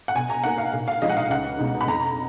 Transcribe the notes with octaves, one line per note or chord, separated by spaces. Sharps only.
F#5
B2 G#5
A#5
A#3 D#4 F#5
F5
A#2
F5
F3 G#3 D#4 D#5
F#5
F5
C#2 F#5
B2 G#3 D#4
B5
F2 A#5